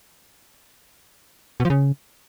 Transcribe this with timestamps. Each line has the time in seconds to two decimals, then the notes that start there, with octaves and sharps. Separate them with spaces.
1.60 B2
1.65 F3
1.70 C#3